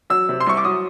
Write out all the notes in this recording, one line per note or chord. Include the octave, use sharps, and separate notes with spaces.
F#3 E6
C3
C6
C2 C#6
D6
F#3 D#6